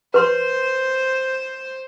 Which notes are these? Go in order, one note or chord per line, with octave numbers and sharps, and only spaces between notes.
B4 C5 C6